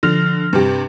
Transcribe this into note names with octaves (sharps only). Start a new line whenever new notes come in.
D3 F3 F6 A#6
G2 C3 G4